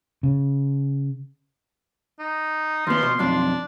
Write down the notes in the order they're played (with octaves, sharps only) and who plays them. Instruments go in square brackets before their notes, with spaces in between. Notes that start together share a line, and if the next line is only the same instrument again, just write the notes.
[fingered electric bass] C#3
[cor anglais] D#4
[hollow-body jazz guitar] D#2 B3 [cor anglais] F3 [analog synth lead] C6
[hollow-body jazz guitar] B2
[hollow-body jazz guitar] B1 F2 [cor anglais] D4